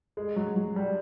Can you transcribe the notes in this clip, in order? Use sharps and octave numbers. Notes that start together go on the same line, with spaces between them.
G#3
F#3
F#3
G3